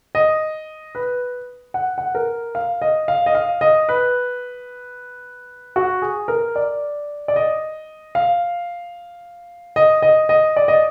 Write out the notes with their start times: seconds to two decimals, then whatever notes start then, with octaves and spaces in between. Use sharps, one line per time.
0.15 D#5
0.95 B4
1.74 F#5
1.98 F#5
2.15 A#4
2.55 F5
2.82 D#5
3.08 F5
3.26 D#5
3.35 F5
3.61 D#5
3.89 B4
5.76 F#4
6.02 G#4
6.28 A#4
6.56 D5
7.28 D5
7.36 D#5
8.15 F5
9.76 D#5
10.02 D#5
10.29 D#5
10.56 D5
10.68 D#5